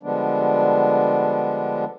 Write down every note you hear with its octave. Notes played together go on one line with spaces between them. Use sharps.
D3 F3 G3 G#3 B3 D4